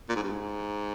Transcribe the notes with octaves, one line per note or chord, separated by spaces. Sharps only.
A#2
G#2
G2
G#2